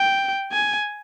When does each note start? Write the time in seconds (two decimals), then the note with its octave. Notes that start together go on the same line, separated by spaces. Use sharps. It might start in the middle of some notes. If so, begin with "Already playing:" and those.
Already playing: G5
0.52 G#5